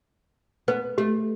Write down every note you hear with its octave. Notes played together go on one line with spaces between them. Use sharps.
B3 B4
A3 G4